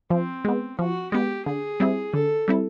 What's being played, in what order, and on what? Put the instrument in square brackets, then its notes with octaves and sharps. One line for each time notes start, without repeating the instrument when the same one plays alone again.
[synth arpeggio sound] F3 [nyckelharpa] C4
[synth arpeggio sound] G#3 B3
[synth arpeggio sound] F3 [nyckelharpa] F#4
[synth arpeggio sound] G#3 B3 [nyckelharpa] G4
[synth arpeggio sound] D3 [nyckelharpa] G#4
[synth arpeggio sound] G3 C4 E4
[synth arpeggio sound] D3 [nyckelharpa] A4
[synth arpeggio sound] G3 C4 E4